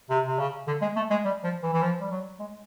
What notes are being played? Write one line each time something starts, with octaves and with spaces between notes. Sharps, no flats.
C3
C3
C#3
D3
G#3
A3
G#3
G3
F3
E3
E3
F3
G3
F#3
G#3